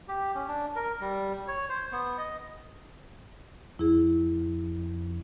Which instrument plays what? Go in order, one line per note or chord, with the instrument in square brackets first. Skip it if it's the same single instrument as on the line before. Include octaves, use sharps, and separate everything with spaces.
[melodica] G4
C#4
D4
A#4
G3
C#5
C5
B3
D#5
[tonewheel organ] F2 [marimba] E4 G#4